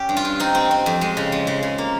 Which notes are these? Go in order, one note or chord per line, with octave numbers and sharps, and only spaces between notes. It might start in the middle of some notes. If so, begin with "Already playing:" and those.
Already playing: C#4 G4
G2
F4
G2
C4 D#4
C4
C4
F2
G#3
C#3
F3
C#3
C#3
A#3